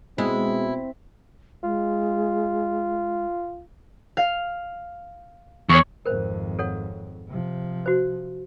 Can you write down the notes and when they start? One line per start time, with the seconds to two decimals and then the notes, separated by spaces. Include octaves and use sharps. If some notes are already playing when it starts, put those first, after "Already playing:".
0.18 B2 G#3 C4 E4
1.63 G#3 F4
4.17 F5
5.69 E2 C#5 C#6
6.06 G#1 F2 A#4 C5
6.59 A4 C#5 F#5
7.28 C3 F3
7.86 F#4 C5